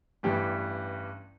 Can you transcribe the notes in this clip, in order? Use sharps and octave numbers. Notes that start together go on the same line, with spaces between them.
A1 G2 E3 G3 G4